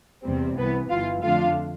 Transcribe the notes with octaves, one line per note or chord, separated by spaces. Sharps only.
E2 C3 G3 C4
C2 C3 E3 B3 B4
G1 G2 E3 F4 F5
F2 D3 A3 D4 F4 F5